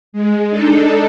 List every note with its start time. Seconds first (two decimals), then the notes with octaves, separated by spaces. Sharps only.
0.13 G#3
0.50 D4 D#4 A4